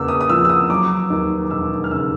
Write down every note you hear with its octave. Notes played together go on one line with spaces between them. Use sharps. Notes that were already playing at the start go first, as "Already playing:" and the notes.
Already playing: E2 C#3 A#3 D6 E6
D#6
D#6
F3 E6
E6
D#6
F#3 D6
D#2
E1 E6
F6
C#3 E6